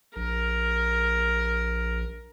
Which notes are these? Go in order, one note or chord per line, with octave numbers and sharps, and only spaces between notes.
A#1 A#4